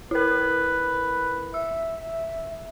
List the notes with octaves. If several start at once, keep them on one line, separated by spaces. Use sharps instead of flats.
E4 A#4 B4
E5 E6